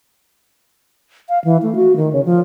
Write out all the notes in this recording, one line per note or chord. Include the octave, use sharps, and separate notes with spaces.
F5
E3
A3
F#4
D#3
C#3
F3